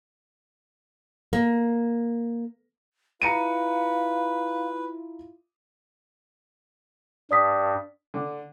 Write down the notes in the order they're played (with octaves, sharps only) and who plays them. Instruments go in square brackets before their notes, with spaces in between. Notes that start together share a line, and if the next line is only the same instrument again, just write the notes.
[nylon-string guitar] A#3
[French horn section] E4 F4 [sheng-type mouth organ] B4 [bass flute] F5 [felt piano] A#5 C#7 D#7
[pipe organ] G2 [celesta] D5 D#6 B6
[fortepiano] D3